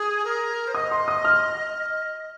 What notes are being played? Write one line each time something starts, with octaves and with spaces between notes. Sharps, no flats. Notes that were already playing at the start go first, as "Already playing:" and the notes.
Already playing: G#4 D#6
A#4
C5
D#5 D#6
C6
D#6
F6